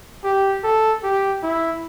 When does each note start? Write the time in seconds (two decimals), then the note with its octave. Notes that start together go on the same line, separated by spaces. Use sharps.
0.25 G4
0.64 A4
1.04 G4
1.43 E4